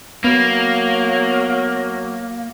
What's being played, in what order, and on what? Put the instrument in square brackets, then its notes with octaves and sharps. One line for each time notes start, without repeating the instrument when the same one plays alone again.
[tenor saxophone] F#3 [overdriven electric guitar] A#3 [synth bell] B3